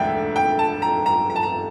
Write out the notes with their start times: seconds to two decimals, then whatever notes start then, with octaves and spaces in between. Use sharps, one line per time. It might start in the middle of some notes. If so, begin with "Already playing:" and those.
Already playing: E1 D2 D3 A3 E5 G5
0.36 G5
0.59 A5
0.82 A#5
1.06 A#5
1.30 A#5
1.36 A5
1.43 A#5